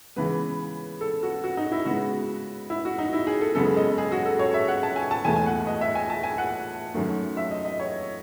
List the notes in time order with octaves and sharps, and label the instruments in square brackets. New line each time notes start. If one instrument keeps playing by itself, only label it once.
[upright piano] C#3 E3 G#3 B3 B4
A4
F#4
F#4
D#4
E4
C#3 G#3 B3 F#4
E4
F#4
D#4
E4
G#4
A4
F#2 C#3 G#3 B3 A4
D#5
G#4
F#4
A4
C#5
E5
F#5
A5
G#5
A5
E2 B2 A3 G#5
G#5
F#5
D#5
E5
G#5
A5
G#5
F#5
F#2 D#3 F#3 A3
E5
D#5
D#5
C#5